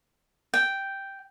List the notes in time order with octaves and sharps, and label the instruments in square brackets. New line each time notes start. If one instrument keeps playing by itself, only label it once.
[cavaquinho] G5